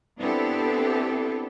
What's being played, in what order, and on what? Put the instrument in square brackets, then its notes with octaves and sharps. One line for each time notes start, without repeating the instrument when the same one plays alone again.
[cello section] B3 C4 D4 E4 G4 A4